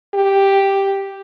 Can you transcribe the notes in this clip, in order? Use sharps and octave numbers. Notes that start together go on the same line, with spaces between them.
G4